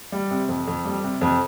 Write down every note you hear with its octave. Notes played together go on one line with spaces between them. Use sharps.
G3
C3
F2
F2
G3
C3
F2